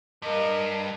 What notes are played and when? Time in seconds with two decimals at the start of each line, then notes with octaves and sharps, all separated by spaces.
0.22 G2 A#4 D#5